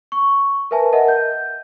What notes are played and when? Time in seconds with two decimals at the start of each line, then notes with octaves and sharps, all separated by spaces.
0.12 C#6
0.71 A#4 B4 E5 G#5 A5
0.93 A#4 D#5 E5 F#5
1.08 G6